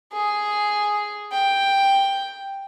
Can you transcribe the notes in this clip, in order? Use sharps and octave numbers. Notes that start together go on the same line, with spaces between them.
G#4
G5